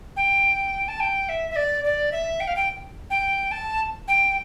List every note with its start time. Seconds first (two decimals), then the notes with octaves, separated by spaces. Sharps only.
0.16 G5
0.88 A5
1.00 G5
1.29 E5
1.50 E5
1.56 D5
1.84 D5
2.12 E5
2.40 G5
2.48 F5
2.56 G5
3.10 G5
3.51 A5
4.08 G5